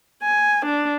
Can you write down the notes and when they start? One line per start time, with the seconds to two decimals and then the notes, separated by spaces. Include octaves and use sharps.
0.23 G#5
0.65 D4